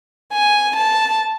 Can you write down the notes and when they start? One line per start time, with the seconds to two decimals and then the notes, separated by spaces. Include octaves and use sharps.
0.33 G#5
0.76 A5